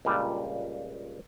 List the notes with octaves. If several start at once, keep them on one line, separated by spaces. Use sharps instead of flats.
C#2 A#2 G3 D4